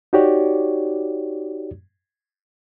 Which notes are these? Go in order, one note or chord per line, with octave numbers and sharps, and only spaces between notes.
D#4 F#4 G4 C#5 D5